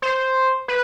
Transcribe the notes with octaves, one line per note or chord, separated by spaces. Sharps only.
C5
B4